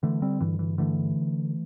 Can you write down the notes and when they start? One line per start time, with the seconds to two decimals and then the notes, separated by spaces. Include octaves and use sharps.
0.03 D3 E3 A3
0.22 G3 C4
0.40 G2 E3
0.59 E3
0.78 D3 E3 A3